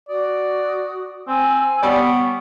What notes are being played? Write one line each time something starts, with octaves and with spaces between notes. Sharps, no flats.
F#4 D5 D#6
C4 G#5 E6
G3 B3 C#5 D5